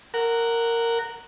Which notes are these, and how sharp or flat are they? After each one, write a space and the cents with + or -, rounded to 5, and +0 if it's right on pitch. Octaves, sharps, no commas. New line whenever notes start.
A#4 -10 F#5 +0